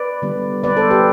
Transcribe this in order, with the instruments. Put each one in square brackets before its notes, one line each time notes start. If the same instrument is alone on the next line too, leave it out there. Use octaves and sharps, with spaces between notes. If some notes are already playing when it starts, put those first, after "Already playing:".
Already playing: [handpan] B4 D5
D3 G3 B3
D3 G3 B3 B4 D5
A4 C5
G4 B4